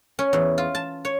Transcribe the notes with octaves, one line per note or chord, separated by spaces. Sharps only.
C#4
E2
F4
A5
C#5